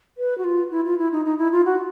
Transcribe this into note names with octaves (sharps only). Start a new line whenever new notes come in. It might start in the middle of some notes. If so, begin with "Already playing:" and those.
B4
F#4
F4
E4
F4
E4
D#4
D#4
E4
F4
F#4